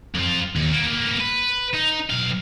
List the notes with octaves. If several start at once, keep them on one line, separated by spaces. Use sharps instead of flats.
F2 F4
D#2
A#3 B3
B4
D#4
B1 F5